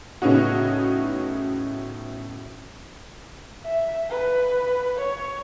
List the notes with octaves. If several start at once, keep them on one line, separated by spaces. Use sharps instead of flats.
A2 C#3 B3 C#4 D#4 F#4
E5
B4
C#5